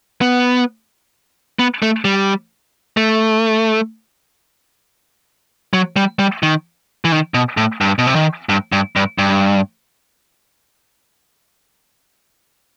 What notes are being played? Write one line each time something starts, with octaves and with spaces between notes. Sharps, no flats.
B3
B3
A3
G3
A3
F#3
G3
G3
D#3
E3
D#3
B2
A2
G2
B2
C3
D#3
G2
G2
G2
G2